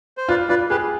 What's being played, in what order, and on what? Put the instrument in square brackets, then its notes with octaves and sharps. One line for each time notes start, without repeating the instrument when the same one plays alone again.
[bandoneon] C5
[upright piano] F4 [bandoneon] B4 D5
[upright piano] F4 [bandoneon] B4 D5
[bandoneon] G4 B4 [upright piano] G#4